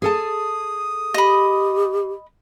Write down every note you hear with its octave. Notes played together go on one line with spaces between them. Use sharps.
G#4 A4 A5 D#6
G4 D#5 B5